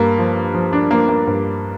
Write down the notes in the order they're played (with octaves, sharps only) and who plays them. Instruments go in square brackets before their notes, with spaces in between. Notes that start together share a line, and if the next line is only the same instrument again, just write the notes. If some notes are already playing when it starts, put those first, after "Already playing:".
Already playing: [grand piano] G2 A#3
F3
F3
D4
F3 A#3
A#3
G2